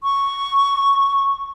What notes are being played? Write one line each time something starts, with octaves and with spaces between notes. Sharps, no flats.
C#6